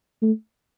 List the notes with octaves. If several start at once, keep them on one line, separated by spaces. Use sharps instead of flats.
A3